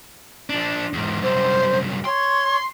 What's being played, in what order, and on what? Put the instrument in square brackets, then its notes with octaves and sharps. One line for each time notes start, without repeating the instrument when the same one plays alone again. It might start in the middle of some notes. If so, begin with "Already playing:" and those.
[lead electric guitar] F3 D4
E2 G#2
[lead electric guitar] C2 F#2 [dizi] C5
[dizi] C#5 [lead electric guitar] C6